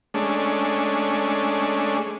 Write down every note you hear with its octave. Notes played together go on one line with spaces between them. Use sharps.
G#3 A3 C#4 D4